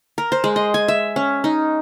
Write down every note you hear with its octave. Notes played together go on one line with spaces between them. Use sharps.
A#4
C5
G#3
D#5
G#5
E5
C#4
D#4